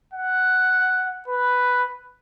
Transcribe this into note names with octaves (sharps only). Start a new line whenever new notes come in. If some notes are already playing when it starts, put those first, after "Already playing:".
F#5
B4